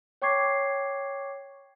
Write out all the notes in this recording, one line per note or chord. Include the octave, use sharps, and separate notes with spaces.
C#5 G5 C#6 D6 G#6 C7